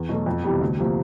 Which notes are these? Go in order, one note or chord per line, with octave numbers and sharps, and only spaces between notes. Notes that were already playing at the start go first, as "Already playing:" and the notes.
Already playing: E2
B2 F#3 A3
F2
C3 E3 G3 B3
D2
C3 F3 A#3